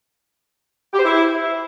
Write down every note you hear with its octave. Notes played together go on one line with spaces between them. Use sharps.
G4
C5
E4